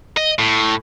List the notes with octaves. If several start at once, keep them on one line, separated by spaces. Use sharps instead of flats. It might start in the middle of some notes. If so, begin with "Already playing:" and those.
D#5
A2